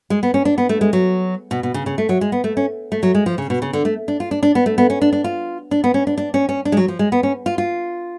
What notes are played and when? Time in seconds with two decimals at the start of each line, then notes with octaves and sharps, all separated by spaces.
0.10 G#3
0.23 B3
0.34 C#4
0.45 D4
0.58 B3
0.69 A3
0.81 G#3
0.93 F#3
1.51 B2
1.63 B2
1.74 C#3
1.86 C#3
1.98 A3
2.09 F#3
2.21 G#3
2.32 B3
2.44 A3
2.57 C#4
2.92 A3
3.03 F#3
3.15 G#3
3.26 F3
3.38 C#3
3.50 B2
3.62 C#3
3.73 D3
3.85 A3
4.08 D4
4.20 F4
4.31 D4
4.43 D4
4.55 B3
4.66 A3
4.78 B3
4.90 C#4
5.01 D4
5.13 D4
5.24 F4
5.71 D4
5.84 B3
5.94 C#4
6.07 D4
6.18 D4
6.34 C#4
6.49 C#4
6.65 D4
6.72 G#3
6.77 F#3
6.88 F3
6.99 G#3
7.12 B3
7.23 C#4
7.46 F4
7.58 F4